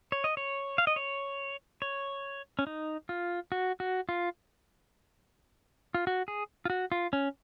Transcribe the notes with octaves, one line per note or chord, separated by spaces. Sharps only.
C#5
D#5
C#5
F5
D#5
C#5
C#5
C#4
D#4
F4
F#4
F#4
F4
F4
F#4
G#4
F4
F#4
F4
C#4